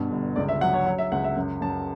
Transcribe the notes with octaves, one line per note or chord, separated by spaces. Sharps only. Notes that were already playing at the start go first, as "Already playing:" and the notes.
Already playing: G2 B2
G1
C#2 D5
E5
F#3 F#5
C#5
F#3 C#5
E5
C#2 F#5
E5
F#2
F#2 A5